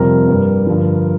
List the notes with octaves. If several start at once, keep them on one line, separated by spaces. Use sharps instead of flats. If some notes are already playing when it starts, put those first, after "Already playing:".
Already playing: F2 C3 G3 A#4
G2 G3
G2 D3 F3